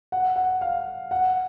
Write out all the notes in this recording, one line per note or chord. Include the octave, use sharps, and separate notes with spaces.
F#5
F#5
F5
F#5